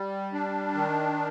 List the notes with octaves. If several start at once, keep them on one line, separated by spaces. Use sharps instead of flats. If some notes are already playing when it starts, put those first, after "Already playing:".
Already playing: G3
D4
D#3